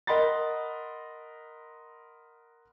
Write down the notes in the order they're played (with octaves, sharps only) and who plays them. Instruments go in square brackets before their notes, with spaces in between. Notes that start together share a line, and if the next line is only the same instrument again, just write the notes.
[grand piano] A#4 D#5 F#5 B5 C6 A6